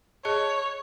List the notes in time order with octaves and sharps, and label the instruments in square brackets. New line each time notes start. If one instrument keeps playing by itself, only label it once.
[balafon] G#4 D#5 A5 [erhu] C#5